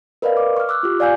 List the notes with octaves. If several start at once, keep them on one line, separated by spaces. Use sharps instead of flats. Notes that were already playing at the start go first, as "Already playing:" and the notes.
A#4 B4 D5 D#5 F5
D6
C#6 F6
D6 E6 F#6
F4 G4
D5 F5 G#5 G6